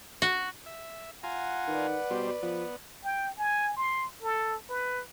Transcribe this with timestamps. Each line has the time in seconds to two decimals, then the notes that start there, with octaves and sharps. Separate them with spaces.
0.22 F#4
0.66 E5
1.23 F4 F#5 G#5 A#5
1.68 D#3 B4 D5
2.11 B2 G3 C5
2.43 F3 B3
3.04 G5
3.38 G#5
3.77 C6
4.23 A4
4.69 B4